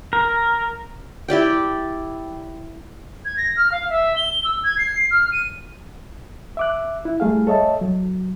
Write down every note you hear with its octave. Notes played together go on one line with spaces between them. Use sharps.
A#4
E4 G4 D5 G5
G#6
A#6
F6
F5
E5
G7
E6
G#6
C7
F6
D#7
E5 D6 F#6
E4
G3 A3 G#4 F5
A4 C#5 D#5 E5 A5
F#3